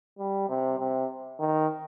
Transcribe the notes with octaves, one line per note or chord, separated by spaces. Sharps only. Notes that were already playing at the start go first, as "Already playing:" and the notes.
G3
C3
C3
D#3